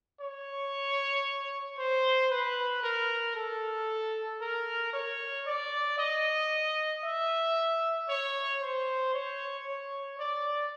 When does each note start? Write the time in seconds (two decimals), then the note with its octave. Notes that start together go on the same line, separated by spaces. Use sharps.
0.21 C#5
1.78 C5
2.31 B4
2.83 A#4
3.36 A4
4.42 A#4
4.93 C#5
5.47 D5
5.98 D#5
7.04 E5
8.09 C#5
8.62 C5
9.14 C#5
9.67 C#5
10.19 D5